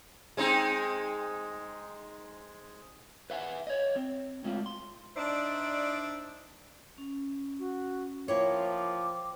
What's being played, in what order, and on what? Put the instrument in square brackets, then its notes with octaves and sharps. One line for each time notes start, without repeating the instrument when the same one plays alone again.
[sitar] G#3 C4 D#4
[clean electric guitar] B4 E5 F#5 G#5
C#5 D#5
C4
A2 G#3 F4
C6
[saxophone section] D4 D#4 C5 D5 E5
[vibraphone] C#4
[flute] F#4
[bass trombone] F3 [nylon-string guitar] A#3 E4 C#5 [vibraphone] C5 G5 [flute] D6